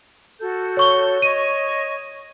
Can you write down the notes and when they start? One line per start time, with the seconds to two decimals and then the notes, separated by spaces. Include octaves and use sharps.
0.40 F#4 A4 G6
0.77 C#5 C#6 G7
1.22 C#5 D#5 C#6 D#7